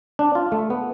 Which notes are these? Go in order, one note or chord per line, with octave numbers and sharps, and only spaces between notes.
D4
F4
A3
B3